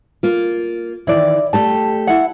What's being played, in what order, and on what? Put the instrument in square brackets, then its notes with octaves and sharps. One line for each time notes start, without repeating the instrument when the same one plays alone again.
[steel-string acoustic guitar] A#3 F4
[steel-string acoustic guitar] D#3 E3 [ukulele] E4 D5
[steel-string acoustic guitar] A3 G4 A4 [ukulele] A5
[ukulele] E4 F#5